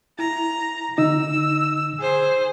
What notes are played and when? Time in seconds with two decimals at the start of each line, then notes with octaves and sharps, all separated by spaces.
0.19 E4 A#5
0.98 D3 D#4 E6
2.00 G#4 C5